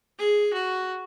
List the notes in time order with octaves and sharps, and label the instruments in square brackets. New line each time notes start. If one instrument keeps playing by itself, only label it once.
[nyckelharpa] G#4
F#4